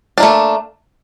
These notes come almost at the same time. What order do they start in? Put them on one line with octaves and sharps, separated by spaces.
D4 A#3 A3